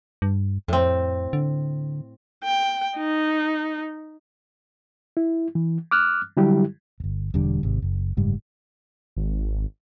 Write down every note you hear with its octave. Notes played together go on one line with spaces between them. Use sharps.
G2
F2 A2 C4
D3
G5
D#4
E4
E3
D6 F6 F#6
D3 F#3 G3 E4 G4
D1 G1
E1 D3 G3 D4
G#1 C3
F#1
F#1 G#2 G3
G#1